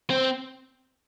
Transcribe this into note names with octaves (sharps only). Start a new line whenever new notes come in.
C4